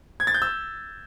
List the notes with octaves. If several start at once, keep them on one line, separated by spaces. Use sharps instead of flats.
G#6
A6
G6
E6